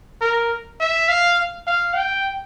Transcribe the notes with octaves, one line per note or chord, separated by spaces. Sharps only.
A#4
E5
F5
F5
G5